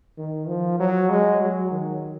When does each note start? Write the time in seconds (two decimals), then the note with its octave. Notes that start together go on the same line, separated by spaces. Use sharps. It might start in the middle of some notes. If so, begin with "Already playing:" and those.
0.18 D#3
0.48 F3
0.80 F#3
1.10 G#3
1.40 F#3
1.71 D#3